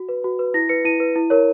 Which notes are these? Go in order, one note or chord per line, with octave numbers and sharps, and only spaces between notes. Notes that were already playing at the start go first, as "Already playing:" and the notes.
Already playing: F#4
B4
F#4
B4
E4 A#6
B4 C#7
E4 D#7
B4
E4
A#4 C#5